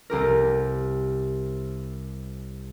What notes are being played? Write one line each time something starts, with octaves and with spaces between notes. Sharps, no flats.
C2 G4 A#4